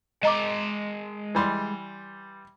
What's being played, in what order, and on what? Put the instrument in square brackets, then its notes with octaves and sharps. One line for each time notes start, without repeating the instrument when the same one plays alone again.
[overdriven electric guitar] G#3 A5 [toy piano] D#5 A#5 D6
[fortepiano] E3 G3 C6